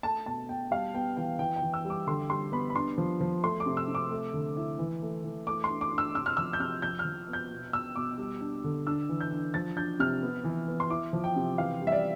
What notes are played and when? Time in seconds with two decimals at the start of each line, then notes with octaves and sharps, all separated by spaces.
0.03 A3 A5
0.26 B2 A5
0.49 B2 G5
0.71 G3 F5
0.94 B3 G5
1.17 E3 G5
1.39 E3 G5
1.56 G5
1.62 E3
1.74 E6
1.85 G3
1.90 D6
2.07 D3 C6
2.30 G3 C6
2.52 B3 B5
2.70 B5
2.75 D4 C6
2.98 F3
3.20 F3
3.43 A3 C6
3.60 D6
3.66 C3
3.77 E6
3.88 C3
3.95 D6
4.11 A3
4.33 D3
4.57 E4
4.79 E3
5.02 A3
5.24 E3
5.47 A3 D6
5.64 C6
5.69 D4
5.81 D6
5.92 D4
5.98 E6
6.15 C3 E6
6.26 F6
6.37 F3 E6
6.53 G6
6.60 C3 F6
6.82 F3 G6
6.99 F6
7.05 F3
7.28 B3
7.33 G6
7.51 B2
7.73 B2 E6
7.95 B2 D6
8.18 G3
8.41 D4
8.64 D3
8.86 D4 E6
9.09 E3
9.21 G6
9.32 D4
9.54 F3 A6
9.77 D4 G6
10.00 C3 F6
10.23 B3
10.44 E3
10.68 B3
10.80 C6
10.90 E4 D6
11.13 F3
11.24 G5
11.36 C3
11.58 E3 F5
11.81 G3
11.87 E5
11.92 D5